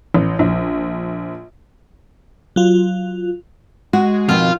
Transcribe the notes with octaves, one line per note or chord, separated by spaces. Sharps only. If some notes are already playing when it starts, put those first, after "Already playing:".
A1
A#1
F#3 F4
G#3 F#4
F2 B2 D#3 F4